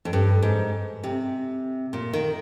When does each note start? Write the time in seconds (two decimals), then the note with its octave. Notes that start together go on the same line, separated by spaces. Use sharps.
0.05 F2
0.13 G2
0.42 G#2
1.03 C3
1.93 A#2
2.13 D#3